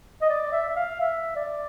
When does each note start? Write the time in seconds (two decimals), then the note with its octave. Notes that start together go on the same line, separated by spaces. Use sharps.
0.22 D#5
0.30 D5
0.52 E5
0.69 E5
0.76 F5
1.00 E5
1.36 D5